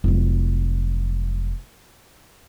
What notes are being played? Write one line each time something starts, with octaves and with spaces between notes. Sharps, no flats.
F1 F#3